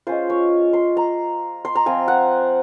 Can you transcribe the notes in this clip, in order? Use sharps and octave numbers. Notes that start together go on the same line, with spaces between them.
G#3 C#4 F4 C5
C#5
C6
A#5
C6
A#5
F3 C4 F4 G#5
F#5